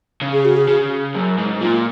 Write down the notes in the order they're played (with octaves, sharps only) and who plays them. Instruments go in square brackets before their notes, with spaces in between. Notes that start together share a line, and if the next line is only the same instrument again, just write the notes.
[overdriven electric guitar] C#3
[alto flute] G#4
F#4
G#4
[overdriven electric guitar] C#3
F#2
G#2
[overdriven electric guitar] A#2 [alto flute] F4